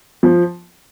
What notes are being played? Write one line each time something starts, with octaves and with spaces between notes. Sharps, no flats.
F3